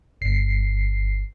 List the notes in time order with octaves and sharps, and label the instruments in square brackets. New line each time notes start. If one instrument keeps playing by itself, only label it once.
[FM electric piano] G1 C7